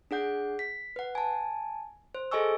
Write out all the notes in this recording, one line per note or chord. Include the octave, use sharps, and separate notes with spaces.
D4 G#4 F#5 G6
B6
B4 F#5
G#5 A5
C5
G#4 A4 D#5 G#5 C#6 E6